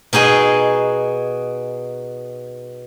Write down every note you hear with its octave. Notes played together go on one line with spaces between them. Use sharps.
B2 D#4 G#4 D#5 B5